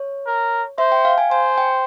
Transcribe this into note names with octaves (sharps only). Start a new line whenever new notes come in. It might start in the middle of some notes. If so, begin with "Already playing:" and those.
Already playing: C#5
A#4
C5 E5
G5
F5
G#5
C5 G#5
G5